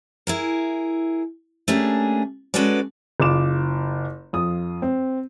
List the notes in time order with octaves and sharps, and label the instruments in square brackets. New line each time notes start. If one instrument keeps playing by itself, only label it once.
[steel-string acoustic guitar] E4 G#4 A#4
A3 A#3 C#4 D4 G4 G#4
G#3 C#4 F#4 A4 B4 D5
[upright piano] F#1 F4 D6 E7
F2 F4 D#6
C4